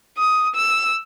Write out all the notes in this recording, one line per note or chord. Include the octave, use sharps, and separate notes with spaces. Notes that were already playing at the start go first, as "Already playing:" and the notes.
D#6
E6